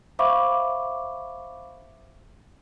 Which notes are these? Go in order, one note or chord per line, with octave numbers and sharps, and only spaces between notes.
C5 E5 F5 B5 C#6 D6